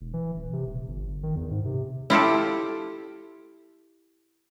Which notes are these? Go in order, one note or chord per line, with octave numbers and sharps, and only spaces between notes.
E1
E3
D#1
C3
D#1
G1
G1
D#3
E2
G#2
C3
E4 F4 G4 A4